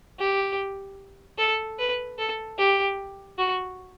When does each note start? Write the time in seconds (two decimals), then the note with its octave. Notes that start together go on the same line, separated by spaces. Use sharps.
0.19 G4
1.38 A4
1.79 B4
2.18 A4
2.58 G4
3.38 F#4